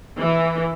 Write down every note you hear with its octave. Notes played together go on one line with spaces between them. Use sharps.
E3